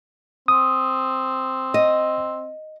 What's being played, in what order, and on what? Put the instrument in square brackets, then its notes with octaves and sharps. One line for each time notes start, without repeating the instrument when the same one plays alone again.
[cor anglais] C4 [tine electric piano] D#6
[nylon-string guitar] D#5